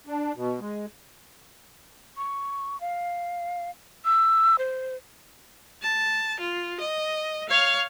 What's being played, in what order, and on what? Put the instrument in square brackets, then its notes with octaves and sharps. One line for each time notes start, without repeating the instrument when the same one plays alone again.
[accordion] D4
B2
G#3
[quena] C#6
F5
E6
C5
[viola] A5
F4
D#5
C#5 F5